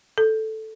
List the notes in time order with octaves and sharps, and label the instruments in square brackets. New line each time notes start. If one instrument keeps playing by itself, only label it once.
[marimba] A4